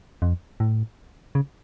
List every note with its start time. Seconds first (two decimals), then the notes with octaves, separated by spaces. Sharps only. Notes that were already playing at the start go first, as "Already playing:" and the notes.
0.22 F2
0.60 A2
1.35 C#3